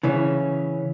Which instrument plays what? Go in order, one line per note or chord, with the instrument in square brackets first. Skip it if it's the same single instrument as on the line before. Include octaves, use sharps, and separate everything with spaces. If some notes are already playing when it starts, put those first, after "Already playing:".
[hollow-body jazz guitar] C#3 E3 C#4